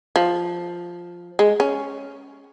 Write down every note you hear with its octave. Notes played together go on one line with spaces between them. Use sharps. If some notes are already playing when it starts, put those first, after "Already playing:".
F3
G#3
C#4